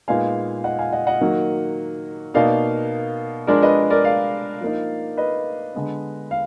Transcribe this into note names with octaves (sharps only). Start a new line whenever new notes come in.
A#2 G#3 B3 D#4 F5 G#5
D#5 F#5
F5 G#5
D#5 F#5
D#5 F#5
D#3 F#3 A#3
B2 A#3 D#4 D5 F5
F3 G#3 D4 A#4 D5
B4 D#5
A#4 D5
D5 F5
F3 A#3 D#4
B4 D#5
D3 G#3 B3
F5